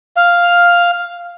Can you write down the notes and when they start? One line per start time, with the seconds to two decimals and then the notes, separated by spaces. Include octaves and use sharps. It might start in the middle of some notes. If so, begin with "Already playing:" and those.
0.16 F5